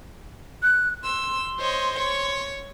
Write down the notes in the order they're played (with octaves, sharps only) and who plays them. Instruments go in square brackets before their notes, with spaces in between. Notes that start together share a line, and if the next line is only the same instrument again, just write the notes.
[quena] F#6
[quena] C6 [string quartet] E6
[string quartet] C5 C#5 D#5
C#5 C#6